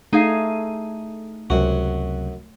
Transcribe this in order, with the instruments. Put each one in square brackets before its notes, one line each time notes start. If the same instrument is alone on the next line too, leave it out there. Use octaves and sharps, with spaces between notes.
[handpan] A3 [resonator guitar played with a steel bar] D#4 G#4 F5
[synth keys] C#2 C3 F#3 [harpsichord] F#2 F#4